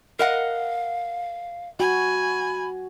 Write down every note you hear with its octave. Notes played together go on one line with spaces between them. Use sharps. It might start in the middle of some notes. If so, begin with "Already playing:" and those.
A#4 D#5 F5 F#5
F#4 G#5 B5